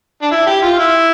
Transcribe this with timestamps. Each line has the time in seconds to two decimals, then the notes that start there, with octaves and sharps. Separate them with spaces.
0.22 D4
0.31 E4
0.47 G4
0.63 F4
0.78 E4